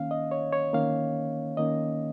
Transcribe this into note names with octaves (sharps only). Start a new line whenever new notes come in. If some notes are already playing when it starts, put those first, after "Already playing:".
Already playing: D#3 A#3 C#4 F5
D#5
C#5
C#5
D#3 A#3 C#4 F5
D#3 A#3 C#4 D#5